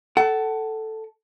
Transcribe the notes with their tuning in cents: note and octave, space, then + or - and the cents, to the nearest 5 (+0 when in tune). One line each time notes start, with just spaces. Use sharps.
A4 +0 F#5 +30